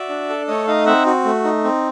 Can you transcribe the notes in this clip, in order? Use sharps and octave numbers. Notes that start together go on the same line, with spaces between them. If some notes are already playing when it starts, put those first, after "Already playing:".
Already playing: F#4 D5 E5
D4
A4
A3 C#5 D#5
D#4 D#5 F5
C4 E5 F#5
F#4
A3
D#4
C4